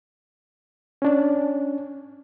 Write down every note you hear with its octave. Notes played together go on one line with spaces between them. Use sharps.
C#4 D4